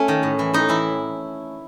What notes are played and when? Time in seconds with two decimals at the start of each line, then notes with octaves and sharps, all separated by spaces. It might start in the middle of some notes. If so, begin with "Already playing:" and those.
Already playing: A3 C#4
0.08 D#3
0.23 A2
0.39 E3
0.54 A2 D#4
0.69 E3 E4